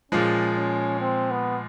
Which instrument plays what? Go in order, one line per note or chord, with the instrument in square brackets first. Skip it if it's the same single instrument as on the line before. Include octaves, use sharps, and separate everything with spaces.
[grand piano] A#2 F3 G#3 [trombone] C#4
[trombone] C#4
C4
B3